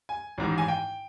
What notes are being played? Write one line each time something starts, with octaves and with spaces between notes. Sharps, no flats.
G#5
A1 G#2 D#3
G#5
G5